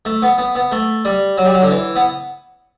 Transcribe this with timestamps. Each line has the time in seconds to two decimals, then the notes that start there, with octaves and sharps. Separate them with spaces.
0.05 A3
0.22 B3
0.38 B3
0.55 B3
0.72 A3
1.05 G3
1.38 F#3
1.46 G3
1.54 F#3
1.62 D3
1.71 E3
1.96 B3